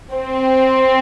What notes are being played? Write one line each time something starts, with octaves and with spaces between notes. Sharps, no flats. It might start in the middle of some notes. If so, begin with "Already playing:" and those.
C4